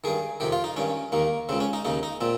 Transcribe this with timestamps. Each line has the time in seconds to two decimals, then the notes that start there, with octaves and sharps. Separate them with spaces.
0.04 G2 D#3 G#4
0.40 F2 C3 D#3 G4
0.52 F4
0.64 D#4
0.76 G2 D#3 C#4
1.12 D#2 D#3 A#3
1.49 C#3 C4
1.53 C#2
1.60 C#4
1.73 D#4
1.85 D#2 C#3 D#4
2.03 D#4
2.21 A#2 C4